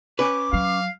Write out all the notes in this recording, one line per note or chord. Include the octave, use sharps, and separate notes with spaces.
C#4 B4 D6
F#3 F5